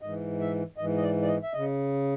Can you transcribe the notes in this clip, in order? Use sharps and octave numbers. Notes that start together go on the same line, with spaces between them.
G#2 E3 D#5
E5
G#2 E3 D#5
D#5
D5
D5
D#5
E5
C#3 D#5